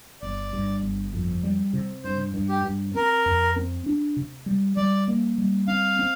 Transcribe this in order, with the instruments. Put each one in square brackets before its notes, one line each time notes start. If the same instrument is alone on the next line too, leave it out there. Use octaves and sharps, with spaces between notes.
[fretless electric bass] G1 [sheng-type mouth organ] D5
[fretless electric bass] G2
G1
F2
G3
C3
[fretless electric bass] G2 [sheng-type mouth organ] C5
[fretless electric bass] G2
[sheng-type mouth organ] G4
[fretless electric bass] G2
[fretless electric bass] C4 [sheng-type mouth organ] A#4
[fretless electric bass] F2
C4
D4
C3
G3
[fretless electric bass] G3 [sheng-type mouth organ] D5
[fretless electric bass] A#3
G3
[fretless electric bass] C4 [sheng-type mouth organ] F5
[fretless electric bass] C4